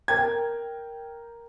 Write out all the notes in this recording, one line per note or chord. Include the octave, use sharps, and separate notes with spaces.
A#4 G5 G#6